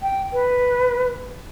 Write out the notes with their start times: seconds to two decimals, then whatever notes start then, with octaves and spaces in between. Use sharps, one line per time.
0.03 G5
0.33 B4